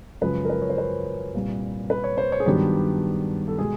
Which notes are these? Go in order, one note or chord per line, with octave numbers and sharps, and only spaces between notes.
F#2 C#3 F3 G#3 C#4 B4
A#4
B4
C#5
C5
B4
C2 A#2 G3
B4
C#5
C5
C#5
G#4
G2 D#3 F#3 B3 D4 G4
A4
B2 G#3 G#4